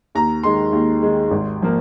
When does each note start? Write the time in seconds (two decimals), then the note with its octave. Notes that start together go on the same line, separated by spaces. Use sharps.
0.15 D#2 A#5
0.43 D#3 G#3 C6
0.73 D#2
1.02 D#3 G#3
1.31 G#1
1.62 F3 A#3